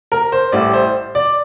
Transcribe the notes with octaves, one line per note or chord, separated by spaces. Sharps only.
A#4
C5
A1 A2 G3 D5
C5
D5